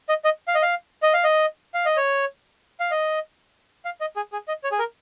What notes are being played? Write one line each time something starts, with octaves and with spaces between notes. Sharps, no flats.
D#5
D#5
F5
D#5
F5
D#5
F5
D#5
F5
D#5
C#5
F5
D#5
F5
D#5
G#4
G#4
D#5
C#5
G#4
A#4